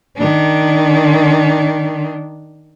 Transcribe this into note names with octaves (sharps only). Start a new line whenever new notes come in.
D#3 D4